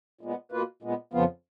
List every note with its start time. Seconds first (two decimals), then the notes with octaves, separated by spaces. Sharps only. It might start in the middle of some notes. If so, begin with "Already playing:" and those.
0.21 A#2 G#3 B3
0.52 B2 A#3 F4 B4
0.82 A#2 G#3 B3
1.13 F2 C#3 F3 B3 F4